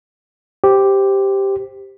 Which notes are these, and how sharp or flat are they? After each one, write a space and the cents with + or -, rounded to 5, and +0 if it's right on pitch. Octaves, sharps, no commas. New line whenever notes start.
G4 +0 C5 +0